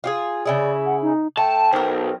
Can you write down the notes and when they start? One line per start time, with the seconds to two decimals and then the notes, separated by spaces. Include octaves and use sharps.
0.04 F4 G4 G#4
0.46 C#3 E4 G#4 D5
0.86 F#5
1.02 D#4
1.37 A3 G5 A5
1.73 B1 C4 A#4